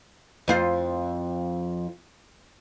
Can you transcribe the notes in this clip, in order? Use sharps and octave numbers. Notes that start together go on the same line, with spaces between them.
F2 F4 C5